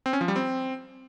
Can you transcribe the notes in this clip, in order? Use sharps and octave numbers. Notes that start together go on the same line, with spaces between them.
C4
C#4
F3
G3
C4